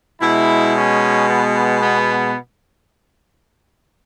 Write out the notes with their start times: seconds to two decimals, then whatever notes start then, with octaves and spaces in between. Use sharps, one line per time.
0.21 B2 G#3 E4
0.74 C#4
1.28 B3
1.81 B3